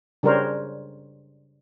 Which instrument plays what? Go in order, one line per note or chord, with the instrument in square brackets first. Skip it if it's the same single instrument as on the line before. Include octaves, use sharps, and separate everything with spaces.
[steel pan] C#3 G3 D4 A#4 C5 C#5